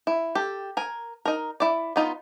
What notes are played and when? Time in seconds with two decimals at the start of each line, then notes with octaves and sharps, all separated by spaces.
0.07 E4
0.35 G4 A4
0.77 A#4 G#5
1.25 D#4 A#4
1.60 E4 D5
1.96 B3 D#4 F4